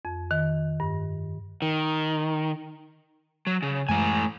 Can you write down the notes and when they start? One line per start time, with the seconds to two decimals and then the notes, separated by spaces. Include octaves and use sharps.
0.05 F2
0.31 D#3
0.80 G2
1.62 D#3
3.47 F#3
3.62 C#3
3.89 F#2 A2 E3 G#3 G#5